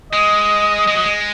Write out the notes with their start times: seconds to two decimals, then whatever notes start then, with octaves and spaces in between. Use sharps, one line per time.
0.13 G#3 D#5
0.87 G#3
0.95 F#3
1.04 G#3